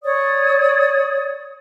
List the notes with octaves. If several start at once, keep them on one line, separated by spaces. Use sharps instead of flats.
C#5 D5 D#6